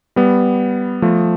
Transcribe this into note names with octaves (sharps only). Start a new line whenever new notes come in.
G3 B3
F3 A3